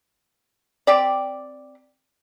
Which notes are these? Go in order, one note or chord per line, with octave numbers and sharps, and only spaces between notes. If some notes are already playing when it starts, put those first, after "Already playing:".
C4 G4 D5